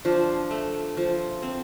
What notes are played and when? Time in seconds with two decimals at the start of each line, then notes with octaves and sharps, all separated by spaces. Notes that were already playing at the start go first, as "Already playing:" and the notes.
0.05 F3 D4
0.51 A3
0.97 F3
1.42 C4